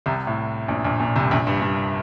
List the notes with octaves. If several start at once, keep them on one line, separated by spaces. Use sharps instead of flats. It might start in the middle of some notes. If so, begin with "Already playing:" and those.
C2 C3
A2
A#1 A#2
A#1 A#2
A#1 A#2
C2 C3
A#1 A#2
G2
G2